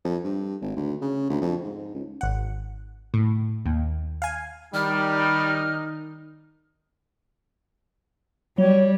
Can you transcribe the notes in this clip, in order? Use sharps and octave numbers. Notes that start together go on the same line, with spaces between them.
F2
G2
G#1
D2
C#3
D2
F2
G#2
C#2
G#1 F#5
A2
D#2
F5 G#5
D#3 G3 D#4 F6
F#3 G3 C#5